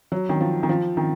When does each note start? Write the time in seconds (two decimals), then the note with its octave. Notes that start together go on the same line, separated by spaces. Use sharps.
0.12 F#3
0.29 D#3
0.40 F3
0.63 D#3
0.69 F3
0.97 D#3